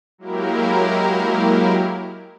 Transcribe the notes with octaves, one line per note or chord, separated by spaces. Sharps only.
F#3 G#3 A#3 E4 G4 A#4